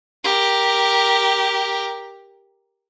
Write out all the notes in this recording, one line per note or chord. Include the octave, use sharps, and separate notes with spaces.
G4 A#4